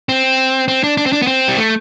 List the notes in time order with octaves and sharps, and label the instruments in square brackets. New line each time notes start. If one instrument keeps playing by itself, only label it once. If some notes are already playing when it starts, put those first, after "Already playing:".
[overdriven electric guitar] C4
C4
D4
D4
C4
D4
B3
C4
G3
A3